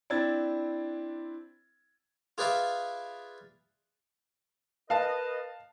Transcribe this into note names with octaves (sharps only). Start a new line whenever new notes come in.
C4 D4 E4 G#6 A6
F4 G#4 B4 D5 E5 F5
A#4 B4 D#5 F5 A5